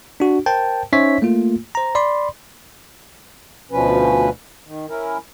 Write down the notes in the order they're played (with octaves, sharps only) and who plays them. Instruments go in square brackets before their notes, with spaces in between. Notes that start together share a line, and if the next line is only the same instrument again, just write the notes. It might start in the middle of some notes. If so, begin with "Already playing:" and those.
[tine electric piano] D4 F#4
A#4 C5 G5 A5
C#4 D#4 C5 C#5 E5 B6
A3 A#3 F4
C5 A#5
D5 B5 C6
[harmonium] D2 B2 F3 C#4 B4
D#3
C#4 E4 A#4